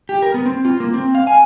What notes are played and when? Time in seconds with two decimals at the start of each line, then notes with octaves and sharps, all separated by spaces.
0.09 G4
0.22 A#4
0.34 B3
0.46 C4
0.65 F4
0.80 A#3
0.94 C4
1.15 F5
1.27 G#5